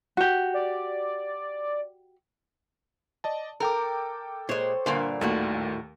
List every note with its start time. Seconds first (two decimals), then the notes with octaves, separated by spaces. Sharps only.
0.17 F#4 G4
0.54 D5
3.24 D5 D#5 A5
3.60 A4 A#4 G5 D6
4.49 A#2 G#3 C5 C#5 C6
4.86 G2 A#2 D3 A#3 D5
5.21 D#2 A2 D#3 A3 A#3 F#4